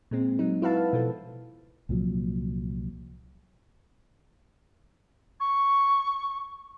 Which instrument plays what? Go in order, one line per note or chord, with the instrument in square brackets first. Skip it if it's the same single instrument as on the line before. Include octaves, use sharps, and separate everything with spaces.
[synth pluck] A#2 G#3 C4
F#3 D#4
E4 F#4 B4 E5 F5 A5
B2 F3 A4
[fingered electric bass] C2 A#2 F3 F#3
[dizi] C#6